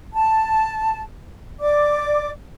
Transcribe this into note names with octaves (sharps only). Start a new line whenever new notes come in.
A5
D5 D6